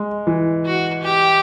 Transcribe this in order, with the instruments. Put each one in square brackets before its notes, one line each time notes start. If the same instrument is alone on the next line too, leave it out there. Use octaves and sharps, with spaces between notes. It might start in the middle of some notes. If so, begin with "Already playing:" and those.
Already playing: [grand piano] G#3
E3
[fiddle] F#4
G4